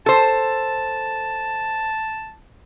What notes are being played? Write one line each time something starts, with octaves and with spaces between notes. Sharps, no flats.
A4 C5 A5